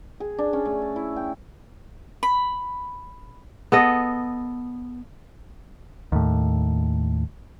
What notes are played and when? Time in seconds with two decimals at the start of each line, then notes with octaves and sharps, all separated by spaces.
0.20 G#4
0.39 D4
0.53 C#4
0.65 A3
0.82 A5
0.96 E4
1.16 G5
2.23 B5
3.72 B3 A4 D#5
6.12 D#2 A2